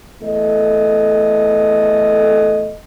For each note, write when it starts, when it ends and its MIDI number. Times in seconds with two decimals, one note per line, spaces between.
0.21 2.74 40
0.21 2.74 57
0.21 2.74 69
0.21 2.74 75